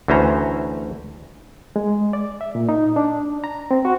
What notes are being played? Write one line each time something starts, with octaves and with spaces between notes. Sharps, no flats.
D2 E3 C#4 C5 A#5
G#3
D5
E5
A#2
D#4
D4
A#5
C4
F#4